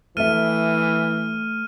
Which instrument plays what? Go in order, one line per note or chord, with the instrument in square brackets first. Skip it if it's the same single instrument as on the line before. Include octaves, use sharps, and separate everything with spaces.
[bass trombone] E3 [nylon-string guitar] A3 E5 [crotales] F6 D#7